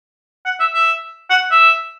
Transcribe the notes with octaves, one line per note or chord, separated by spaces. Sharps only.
F#5
E5
E5
F#5
E5